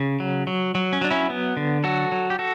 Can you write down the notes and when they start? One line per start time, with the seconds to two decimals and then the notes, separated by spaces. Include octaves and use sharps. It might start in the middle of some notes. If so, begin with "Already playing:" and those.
Already playing: C#3
0.20 F#3
0.47 F#3
0.75 F#3
0.93 C#4
1.01 F#3 D4
1.11 C#4 E4
1.30 B3
1.57 D3
1.84 F#3 F#4 A4
2.12 F#3
2.30 G4
2.39 F#4 A4